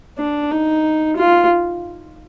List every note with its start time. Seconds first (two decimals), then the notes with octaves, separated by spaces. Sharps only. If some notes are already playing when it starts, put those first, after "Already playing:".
0.18 D4
0.51 D#4
1.17 F4